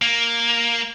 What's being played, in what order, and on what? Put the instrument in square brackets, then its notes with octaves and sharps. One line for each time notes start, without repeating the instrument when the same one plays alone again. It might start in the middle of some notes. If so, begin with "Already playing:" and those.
[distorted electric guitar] A#3